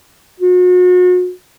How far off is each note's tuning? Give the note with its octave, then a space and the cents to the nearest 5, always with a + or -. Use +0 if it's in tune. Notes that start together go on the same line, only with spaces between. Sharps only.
F#4 -40